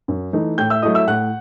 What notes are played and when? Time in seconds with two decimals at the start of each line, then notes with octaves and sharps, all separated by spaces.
0.08 F#2
0.33 E3 A3 D#4
0.58 A2 G5 G6
0.70 E5 E6
0.82 F#3 A3 E4 D#5 D#6
0.95 E5 E6
1.07 A2 F#5 F#6